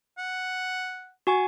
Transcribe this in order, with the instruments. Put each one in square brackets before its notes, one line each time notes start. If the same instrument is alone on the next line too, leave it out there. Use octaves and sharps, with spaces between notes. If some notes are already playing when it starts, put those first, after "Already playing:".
[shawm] F#5
[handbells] F#4 G#5 C#6